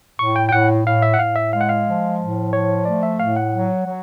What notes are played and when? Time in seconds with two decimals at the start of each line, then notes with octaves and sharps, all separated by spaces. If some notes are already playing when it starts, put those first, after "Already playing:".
0.19 A2 C#6
0.36 G5
0.49 G5
0.52 A2 F#5
0.86 A2 F5
1.02 E5
1.14 F#5
1.19 A2 F5
1.36 E5
1.53 G#3 F5
1.61 F#5
1.69 F5
1.85 F3
2.20 A2
2.53 F3 C#5
2.85 A3 D5
3.03 E5
3.19 A2 F5
3.36 F#5
3.52 F#3
3.86 F#3